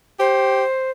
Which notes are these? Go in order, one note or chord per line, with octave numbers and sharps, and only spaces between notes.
G4 C5